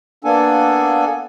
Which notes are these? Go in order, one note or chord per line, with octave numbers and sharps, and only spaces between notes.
A#3 B3 D4 A4 G#5